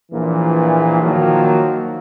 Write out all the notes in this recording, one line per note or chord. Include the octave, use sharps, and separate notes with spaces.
A#1 A#2 E3
D#3 F3 F#3 A#3